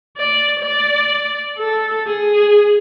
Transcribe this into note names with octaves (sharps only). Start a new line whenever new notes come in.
D5
D5
A4
G#4